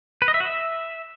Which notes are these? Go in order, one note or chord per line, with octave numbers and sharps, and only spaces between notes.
B4
D#5
E5
F#4
E5